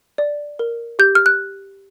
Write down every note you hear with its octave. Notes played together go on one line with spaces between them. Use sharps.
D5
A#4
G4 G6
F6
F#6